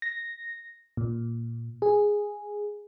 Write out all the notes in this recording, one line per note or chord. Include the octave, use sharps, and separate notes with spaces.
A#6
A#2
G#4